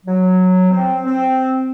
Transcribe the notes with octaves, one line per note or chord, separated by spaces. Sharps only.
F#3
C4
C4